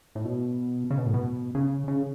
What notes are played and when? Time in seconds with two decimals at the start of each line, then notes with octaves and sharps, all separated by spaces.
0.15 A2
0.25 B2
0.90 C#3
0.98 B2
1.06 A2
1.14 B2
1.55 C#3
1.88 C#3